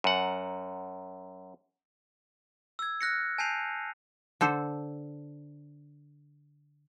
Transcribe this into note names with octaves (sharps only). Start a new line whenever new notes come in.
F#2 F#5
E6 G#6
F6 F#6 A#6 C#7
G#5 A5 G6 C7 D#7 F7
D3 A4 C5